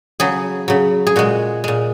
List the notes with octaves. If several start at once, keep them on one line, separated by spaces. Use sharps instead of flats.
C#3 F#3 G#4
C#3 F#3
G#4
A#2 G#3 F#4
A#2 G#3